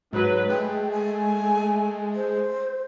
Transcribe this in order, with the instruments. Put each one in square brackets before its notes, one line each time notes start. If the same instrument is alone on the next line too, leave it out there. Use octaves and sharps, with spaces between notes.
[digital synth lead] G#2 [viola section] F#3 B4
[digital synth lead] G#3 [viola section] A3 [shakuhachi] G5
[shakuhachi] G#5
C5